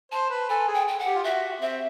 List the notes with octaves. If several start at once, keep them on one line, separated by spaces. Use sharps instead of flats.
C5 A5
B4
A4 G#5
G#4
G5
G5
F#5
G4
F4
F#4 E5
C4 E5